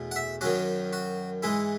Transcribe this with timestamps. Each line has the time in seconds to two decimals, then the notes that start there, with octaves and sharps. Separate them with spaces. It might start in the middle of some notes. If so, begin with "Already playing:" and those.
Already playing: E2 B2 A3
0.11 F#5
0.16 E5
0.41 F#2 D#3 F#3 C#4 F#4
0.93 F#4
1.43 G#2 E3 G#3 E4